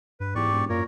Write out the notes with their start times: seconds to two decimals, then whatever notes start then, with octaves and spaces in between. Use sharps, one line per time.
0.20 G2 B4
0.35 E2 G#2 G4 D5 C#6
0.51 E1
0.69 F#2 A#2 A#4 C#5